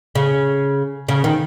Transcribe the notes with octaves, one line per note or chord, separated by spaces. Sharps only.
C#3
C#3
D#3